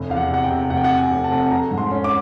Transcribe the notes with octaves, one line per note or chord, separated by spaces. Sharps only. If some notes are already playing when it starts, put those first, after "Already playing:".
Already playing: F1
E2 F5
F#5
C3 F#5
G5
C3
F1 F#5
G5
F#5
C3
G#5
F1
A5
F1
A3 A#5
G#2
C6
C#4
D6